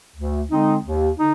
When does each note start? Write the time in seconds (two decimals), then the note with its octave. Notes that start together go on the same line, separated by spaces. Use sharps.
0.16 D2
0.49 D3 G#3 C4 D#4
0.83 D#2
1.17 D3 D#4